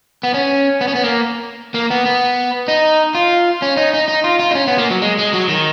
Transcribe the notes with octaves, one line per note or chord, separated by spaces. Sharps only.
B3
C#4
B3
C#4
B3
A#3
A#3
B3
B3
D#4
F4
C#4
D#4
D#4
D#4
F4
F4
D#4
C#4
B3
A#3
F#3
G#3
G#3
F#3
D#3